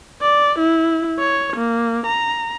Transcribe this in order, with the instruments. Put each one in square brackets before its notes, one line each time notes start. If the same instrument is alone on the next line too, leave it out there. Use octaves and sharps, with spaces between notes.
[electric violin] D5
E4
C#5
A#3
A#5